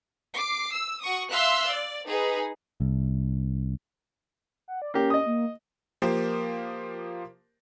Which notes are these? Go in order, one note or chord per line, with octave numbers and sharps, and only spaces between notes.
D6 C7
E6
F#4 C#6 D#6
E5 F5 C6 E6 F#6
D5
D#4 G#4 B4
C2
F#5
D5
A#3 C#4 G4
D#5 D#6
A#3
F3 A#3 G4 A#4 C5